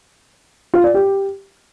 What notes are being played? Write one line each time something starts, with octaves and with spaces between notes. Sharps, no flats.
F4
D5
G4